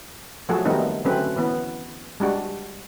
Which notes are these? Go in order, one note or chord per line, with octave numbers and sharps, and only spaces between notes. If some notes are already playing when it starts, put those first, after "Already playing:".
F3 F#3 A3 F#4 G#4 A4
D#3 G3 A3 B3 C4 D#4
D3 F#3 A3 C4 C#4 B4
E3 B3
G3 G#3 D4 F#4